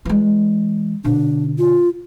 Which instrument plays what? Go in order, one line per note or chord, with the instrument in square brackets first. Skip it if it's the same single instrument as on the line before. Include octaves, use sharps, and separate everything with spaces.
[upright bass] E3 G#3
[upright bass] B2 D3 [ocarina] D4
[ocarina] F4